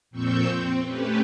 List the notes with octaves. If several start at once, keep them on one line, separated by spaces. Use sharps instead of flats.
F2 A#2 C4 C#6 E6 G6
C4
A3 C#4 G4 B4